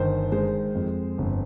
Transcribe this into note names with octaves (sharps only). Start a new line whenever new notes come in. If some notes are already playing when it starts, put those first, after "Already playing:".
Already playing: G1 D#3 C5
G#3 C5
F2
G1